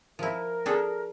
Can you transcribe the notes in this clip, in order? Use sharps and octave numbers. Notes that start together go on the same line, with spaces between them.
F3 E4 A#4
D4 G#4 A4